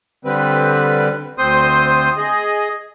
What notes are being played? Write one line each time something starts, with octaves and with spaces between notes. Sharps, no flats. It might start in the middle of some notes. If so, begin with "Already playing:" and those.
D3 G3 C4 B4
D2 C4 C5 C6 D#6
G#4 D#5